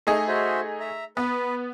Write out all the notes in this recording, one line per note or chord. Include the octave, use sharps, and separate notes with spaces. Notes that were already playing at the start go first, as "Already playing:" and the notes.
A3 D#4 G#4
F#4 C5 E5
E5 A#5
B3 B4